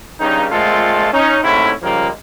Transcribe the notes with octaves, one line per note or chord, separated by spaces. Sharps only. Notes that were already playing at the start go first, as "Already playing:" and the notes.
G2 C#3 D#4
A#2 G#3 A3 C4 F4 A4
C#4 D#4
G#2 C3 A3 C#4 E4
C#3 F3 G3 G#3 A#3